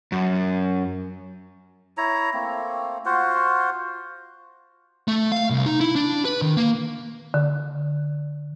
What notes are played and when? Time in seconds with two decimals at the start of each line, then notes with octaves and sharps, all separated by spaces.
0.12 F#2
1.97 E4 C#5 A#5
2.34 A3 A#3 C4
3.05 F4 F#4 C5 F#5
5.08 A3
5.32 F5
5.50 C2
5.66 D#4
5.80 E4
5.96 D4
6.25 B4
6.42 D#3
6.57 A#3
7.34 D3